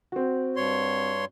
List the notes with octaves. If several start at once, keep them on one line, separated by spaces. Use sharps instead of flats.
C4 F#4
G2 C#5 C6